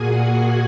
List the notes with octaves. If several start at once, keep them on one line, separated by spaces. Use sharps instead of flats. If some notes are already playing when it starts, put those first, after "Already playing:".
Already playing: A#2 A#3 F#4 G#4 F#5 G#5
G#4 G#5